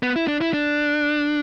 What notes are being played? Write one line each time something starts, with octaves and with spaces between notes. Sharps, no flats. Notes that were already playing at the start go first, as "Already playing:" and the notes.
B3
E4
D4
E4
D4